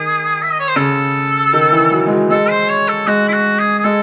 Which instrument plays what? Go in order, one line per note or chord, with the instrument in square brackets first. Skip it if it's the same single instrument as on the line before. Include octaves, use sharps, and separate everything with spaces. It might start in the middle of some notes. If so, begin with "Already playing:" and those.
Already playing: [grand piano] D#3 [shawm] G#4
[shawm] E5
D#5
C#5
C5
[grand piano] C#3 [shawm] A4
[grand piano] D#3
E3
F#3
G#3
F#3
[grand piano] G#3 [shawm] A4
[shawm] C5
C#5
A4
[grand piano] G#3 [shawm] F#4
[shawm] E4
F#4
G#4
G#4
[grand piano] G#3 [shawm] A4